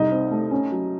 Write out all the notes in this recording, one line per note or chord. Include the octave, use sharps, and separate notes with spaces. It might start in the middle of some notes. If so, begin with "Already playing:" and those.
Already playing: C2 D#4 D#5
C4
A3
C#4
F#3